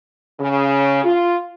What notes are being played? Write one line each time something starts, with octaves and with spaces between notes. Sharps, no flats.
C#3
F4